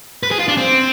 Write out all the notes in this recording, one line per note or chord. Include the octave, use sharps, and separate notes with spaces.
B4
G#4
F4
D4
C4